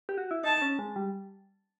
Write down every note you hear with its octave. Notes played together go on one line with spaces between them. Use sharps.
G4
F#4
E4
D#4 A5
C#4
G#3
G3